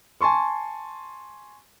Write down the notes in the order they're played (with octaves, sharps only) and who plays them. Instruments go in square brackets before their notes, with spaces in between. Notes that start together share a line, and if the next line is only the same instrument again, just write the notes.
[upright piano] G#5 A5 C6 C#6